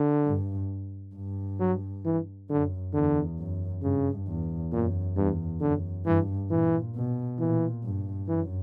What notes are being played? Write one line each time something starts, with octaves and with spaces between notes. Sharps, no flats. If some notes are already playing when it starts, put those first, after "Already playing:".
Already playing: D3
G2
G2
F#3
E3
F#2 D3
E2 D3
F#2
G2 C#3
E2
F#2 A#2
E2 G2
F#2 D3
G2 E3
A#2 E3
B2
A#2 E3
G2
F#2 E3